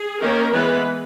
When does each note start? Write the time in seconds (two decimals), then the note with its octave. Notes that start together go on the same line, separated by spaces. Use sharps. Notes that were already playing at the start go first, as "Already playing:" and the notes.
Already playing: G#4
0.21 D#3 A#3 C#4 A#4
0.53 E3 G#3 B3 B4